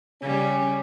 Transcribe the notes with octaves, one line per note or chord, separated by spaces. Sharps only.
C#3 G3 C#4